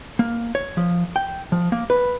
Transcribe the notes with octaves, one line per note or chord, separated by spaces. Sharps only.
A#3
C#5
F3
G5
F3
A#3
B4